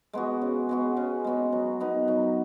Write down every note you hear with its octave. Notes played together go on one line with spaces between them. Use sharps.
G#3 B3 F#4
C#3
G#3 B3 F#4
C#3
G#3 B3 F#4
F#3
B3 D#4 A#4
F#3